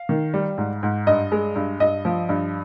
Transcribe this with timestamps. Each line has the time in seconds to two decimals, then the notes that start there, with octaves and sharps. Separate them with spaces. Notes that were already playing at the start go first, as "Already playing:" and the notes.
Already playing: F5
0.09 D#3
0.34 G3
0.58 G#2
0.83 G#2
1.07 G2 D#5
1.32 G#3
1.56 G2
1.80 G2 D#5
2.05 F3
2.29 G2